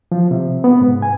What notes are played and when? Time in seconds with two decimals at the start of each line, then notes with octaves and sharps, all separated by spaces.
0.12 F3
0.31 C3
0.64 B3
0.81 G#2
1.02 G#5